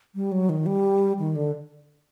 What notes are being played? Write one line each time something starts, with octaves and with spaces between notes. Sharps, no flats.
G3
F#3
D#3
G3
D#3
D3